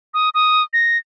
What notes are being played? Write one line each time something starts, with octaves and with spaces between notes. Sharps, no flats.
D#6
D#6
A#6